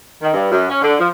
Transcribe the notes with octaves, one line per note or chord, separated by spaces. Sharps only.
D#3
G2
F#2
C#4
D3
F3